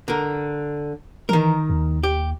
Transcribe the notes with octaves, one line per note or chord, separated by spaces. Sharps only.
D3 A#4
D#3 E3 A#4
D#2
G4